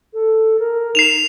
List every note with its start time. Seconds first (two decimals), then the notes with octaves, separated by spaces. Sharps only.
0.14 A4
0.59 A#4
0.95 D#4 C7 E7 F7